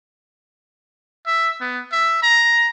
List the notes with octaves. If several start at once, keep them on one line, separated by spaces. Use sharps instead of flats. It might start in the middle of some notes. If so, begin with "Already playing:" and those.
E5
B3
E5
A#5